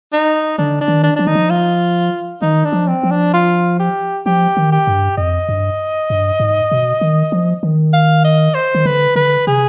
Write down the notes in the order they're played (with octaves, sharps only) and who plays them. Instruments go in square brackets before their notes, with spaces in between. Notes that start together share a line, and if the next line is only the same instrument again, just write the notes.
[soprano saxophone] D#4
[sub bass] D3 [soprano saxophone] D4
[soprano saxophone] D4
[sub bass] D#3
[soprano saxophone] D4
[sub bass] F3 [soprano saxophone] D4
[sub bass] D#3 [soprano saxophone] D#4
[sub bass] F3
[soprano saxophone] F4
[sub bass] D#3 [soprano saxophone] D#4
[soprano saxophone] D4
[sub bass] F3
[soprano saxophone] C4
[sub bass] F3
[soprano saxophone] D4
F4
G4
[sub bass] F3 [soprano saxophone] G4
[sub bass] D#3
[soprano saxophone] G4
[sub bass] G2
[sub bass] F2 [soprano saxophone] D#5
[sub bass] G2
G2
G#2
B2
D#3
F3
D#3
[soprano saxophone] F5
D#5
C5
[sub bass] D#3
[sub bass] D3 [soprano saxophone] B4
[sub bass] D3 [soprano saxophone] B4
[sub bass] C3 [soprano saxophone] G#4